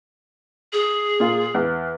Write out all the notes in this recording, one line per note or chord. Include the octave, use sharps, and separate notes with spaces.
G#4
A#2 F4
E2